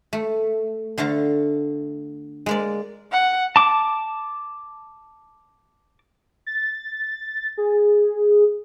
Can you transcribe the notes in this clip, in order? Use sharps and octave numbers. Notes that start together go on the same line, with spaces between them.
A3
D3 A3 F5 A5 A#5
G#3 A#3 D5
F#5
A5 D6
A6
G#4